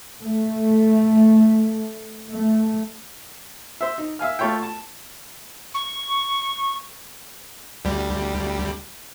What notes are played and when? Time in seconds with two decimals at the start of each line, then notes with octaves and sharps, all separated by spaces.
0.21 A3
2.30 A3
3.81 C5 E5
3.98 D#4
4.19 E5 F5 G#5 F6
4.39 A3 F4 A4 C#5 E5 G5
4.63 A5
5.74 C#6
7.85 D2 G3